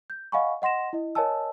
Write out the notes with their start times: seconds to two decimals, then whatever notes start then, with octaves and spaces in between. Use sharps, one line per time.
0.10 G6
0.32 D#5 F5 F#5 G#5 B5 C#6
0.62 D#5 F#5 C6 A#6 E7
0.93 E4 D#5
1.15 A#4 C#5 D#5 G#5 A5 E6